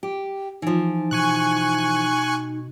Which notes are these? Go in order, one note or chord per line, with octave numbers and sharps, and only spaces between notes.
G4
E3 F3 D#4
B2 G#5 C#6 F#6